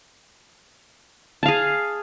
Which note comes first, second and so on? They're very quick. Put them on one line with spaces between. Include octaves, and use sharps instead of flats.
A5 F5 G#4